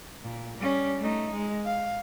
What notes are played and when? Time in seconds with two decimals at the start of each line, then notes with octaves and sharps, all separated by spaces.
0.23 A#2
0.58 G3 C#4
0.99 A3 D#4
1.33 G#3
1.66 F5